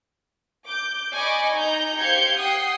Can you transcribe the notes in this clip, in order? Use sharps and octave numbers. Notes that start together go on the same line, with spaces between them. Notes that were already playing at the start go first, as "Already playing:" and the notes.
D6 G6
D5 D#5 G#5 B5 C#6 D6
D#4 A#5 G6
G4 C5 F5 G6 G#6 C#7
F#5 G5 D#6 C7